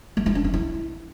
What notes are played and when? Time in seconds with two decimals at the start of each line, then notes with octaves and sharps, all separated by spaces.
0.17 G#3
0.26 E4
0.35 D4
0.44 C#4
0.54 E4